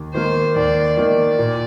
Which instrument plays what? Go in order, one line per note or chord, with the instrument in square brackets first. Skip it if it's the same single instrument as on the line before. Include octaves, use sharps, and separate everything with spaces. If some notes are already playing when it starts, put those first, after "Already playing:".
Already playing: [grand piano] D#2
[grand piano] D#3 A#3 [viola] C5
[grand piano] D#2 [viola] D5
[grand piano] D#3 A#3 [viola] D5
[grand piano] A#2